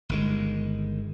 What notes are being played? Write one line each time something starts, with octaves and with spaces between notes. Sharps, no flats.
G1 D#3 G#3